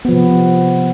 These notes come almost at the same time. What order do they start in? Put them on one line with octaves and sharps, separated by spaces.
B3 F3 C3